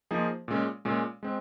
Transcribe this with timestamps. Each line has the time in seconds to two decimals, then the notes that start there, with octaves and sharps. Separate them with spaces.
0.11 F3 A#3 D#4 G#4 C5
0.48 A#2 G#3 C#4
0.85 A#2 G#3 C#4
1.23 G#3 C4